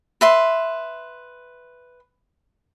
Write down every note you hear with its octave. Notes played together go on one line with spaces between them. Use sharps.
B4 E5 C6